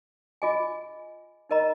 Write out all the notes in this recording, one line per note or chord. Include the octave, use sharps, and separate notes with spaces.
F4 G#4 D#5 G#5
D#4 A#4 D#5 A#5